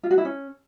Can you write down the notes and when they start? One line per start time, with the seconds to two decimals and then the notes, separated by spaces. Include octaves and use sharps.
0.03 F4
0.11 F#4
0.18 E4
0.25 C#4